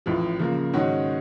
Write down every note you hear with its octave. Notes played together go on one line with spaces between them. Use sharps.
A1 A2 F3
C#3 F3 A#3
G#2 D#3 G#3 C#4 F#4